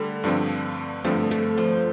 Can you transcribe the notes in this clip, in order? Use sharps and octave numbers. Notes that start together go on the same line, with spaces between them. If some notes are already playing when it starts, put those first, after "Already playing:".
Already playing: D3 G3 A3
G2 D3 F3 C4
G2 D3 F3 A3 C4
A3
F3